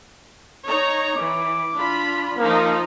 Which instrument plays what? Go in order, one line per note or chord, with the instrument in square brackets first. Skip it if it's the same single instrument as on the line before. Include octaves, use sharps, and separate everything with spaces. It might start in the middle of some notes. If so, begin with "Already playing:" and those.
[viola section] D#4 C#5 A#5
[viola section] E3 [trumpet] D6
[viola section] D4 F4 B5
[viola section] F3 D#4 [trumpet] A#3